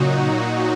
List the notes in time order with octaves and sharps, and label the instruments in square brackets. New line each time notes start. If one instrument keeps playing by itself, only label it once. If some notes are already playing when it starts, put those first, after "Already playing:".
Already playing: [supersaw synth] A#2 F#3 D#4 F#4 [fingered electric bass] C#3